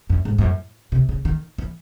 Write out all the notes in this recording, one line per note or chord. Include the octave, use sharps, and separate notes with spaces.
F#2
G#2
G#2
F#2
C3
C#3
D#3
E3